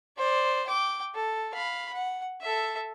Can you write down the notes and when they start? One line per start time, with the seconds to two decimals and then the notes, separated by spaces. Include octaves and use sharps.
0.18 C5 D5
0.67 G5 D6
1.15 A4
1.54 F5 B5
1.93 F#5
2.41 A4 E5